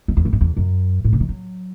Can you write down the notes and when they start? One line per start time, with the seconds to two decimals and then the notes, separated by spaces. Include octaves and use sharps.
0.08 F#2
0.17 E2
0.25 G#2
0.33 F#2
0.41 E2
0.57 F#2
1.05 A2
1.13 C#3
1.20 D#3
1.29 F#3